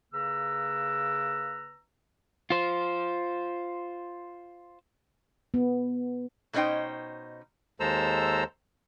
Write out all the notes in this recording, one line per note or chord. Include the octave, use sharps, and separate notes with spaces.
C#3 A#3 B4 A#5 E6
F4 C5
B3
B2 A3 C#4 D#4 C5 G5
D#2 G#3 A4 C5 A#5 E6